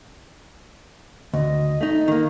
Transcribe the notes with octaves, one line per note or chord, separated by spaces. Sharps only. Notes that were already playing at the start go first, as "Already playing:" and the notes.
D2 D#5
A3 D#4
D#3 A#3